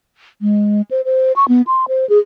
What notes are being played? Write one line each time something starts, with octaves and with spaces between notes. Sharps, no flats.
G#3
C5
C5
C#6
B3
C6
C5
G#4